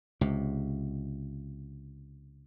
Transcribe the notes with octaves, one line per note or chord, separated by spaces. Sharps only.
C#2 C3